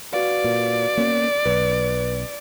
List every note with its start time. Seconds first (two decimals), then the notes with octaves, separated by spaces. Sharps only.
0.13 F#4 B4 D5 F5
0.44 A#2
0.97 A#3 B3 C#4
1.46 B1 B4